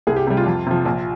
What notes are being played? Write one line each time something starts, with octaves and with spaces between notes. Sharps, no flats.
C2 G#4
G4
C3 G3 G4
F4
F2
C3 F3
A#1